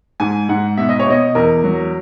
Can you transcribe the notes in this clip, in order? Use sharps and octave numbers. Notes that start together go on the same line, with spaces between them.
G#2 G#5
G#2 F#5
B2 E5
D#5
C#5
B2 D#5
E2 A#4
F#3